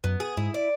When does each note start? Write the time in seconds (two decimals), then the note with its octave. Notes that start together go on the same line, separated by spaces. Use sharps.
0.04 F#2 B3
0.20 G#4
0.37 G#2 E4
0.54 D5